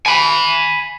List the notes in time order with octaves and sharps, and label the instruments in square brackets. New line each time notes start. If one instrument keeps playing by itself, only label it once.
[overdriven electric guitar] G#5 B5